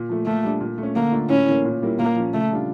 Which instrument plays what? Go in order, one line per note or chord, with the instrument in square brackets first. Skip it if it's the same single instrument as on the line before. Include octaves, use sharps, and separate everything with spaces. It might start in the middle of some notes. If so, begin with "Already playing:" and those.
Already playing: [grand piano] A#2
F3 A3
[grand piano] A#2 [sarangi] A3
[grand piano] G3 D4
A#2
A3
C#4
[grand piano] D3 [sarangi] A#3
[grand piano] A3 D4 F4
[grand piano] A2 [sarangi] C#4
[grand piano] E3 A#3
A#2
G3 A#3 E4
[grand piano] A#2 [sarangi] A#3
[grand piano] F3 C#4
[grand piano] C#3 [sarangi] A3
[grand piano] G3 D4 F4